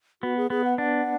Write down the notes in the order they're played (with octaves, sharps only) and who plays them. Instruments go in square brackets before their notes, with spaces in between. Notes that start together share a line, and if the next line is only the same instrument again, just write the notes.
[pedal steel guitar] B3 [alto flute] F#4
[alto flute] G#4
[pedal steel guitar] B3 [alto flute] G#4
[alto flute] F#5
[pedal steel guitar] D4 [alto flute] F#5